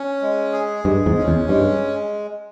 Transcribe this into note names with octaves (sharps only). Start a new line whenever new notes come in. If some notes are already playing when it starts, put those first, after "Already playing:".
Already playing: C#4
G#3
G#4
G2 G#3
E2 G#2
C#4
E2
G2 G#3